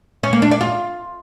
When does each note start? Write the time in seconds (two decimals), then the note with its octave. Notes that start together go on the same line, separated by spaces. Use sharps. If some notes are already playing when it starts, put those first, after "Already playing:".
0.23 C#4
0.33 A#3
0.42 D4
0.51 D5
0.61 F4